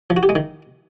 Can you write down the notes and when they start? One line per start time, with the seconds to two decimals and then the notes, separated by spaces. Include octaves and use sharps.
0.10 F3
0.17 F#4
0.23 G4
0.29 G#3
0.35 D#3